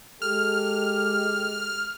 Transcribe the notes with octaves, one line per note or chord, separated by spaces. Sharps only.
G#3 G4 A4 F6